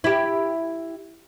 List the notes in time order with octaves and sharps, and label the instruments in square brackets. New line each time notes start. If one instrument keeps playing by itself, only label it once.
[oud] E4 G4